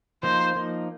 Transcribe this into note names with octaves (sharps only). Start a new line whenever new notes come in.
F3 A#3 D#4 C5
F3 A#3 D#4